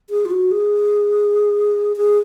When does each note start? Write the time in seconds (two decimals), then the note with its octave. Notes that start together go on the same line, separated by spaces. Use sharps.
0.10 G#4
0.25 F4
0.30 F#4
0.51 G#4
1.96 G#4